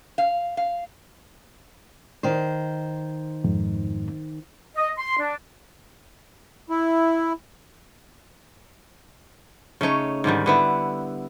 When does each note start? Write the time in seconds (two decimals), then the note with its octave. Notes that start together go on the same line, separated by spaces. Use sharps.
0.18 F5
0.57 F5
2.23 D#3 C5
3.44 F2 G#2
4.77 D#5
4.98 C6
5.19 D4
6.70 E4
9.81 C#3 A3 D#4 C#5
10.24 G#2 D3 D#3 G3
10.46 D3 B3 E4